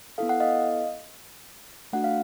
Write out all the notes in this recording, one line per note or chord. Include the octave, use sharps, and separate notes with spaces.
B3 E4 A4 F5
F#5
D#5 F5
A3 D4 F#4 F#5
F5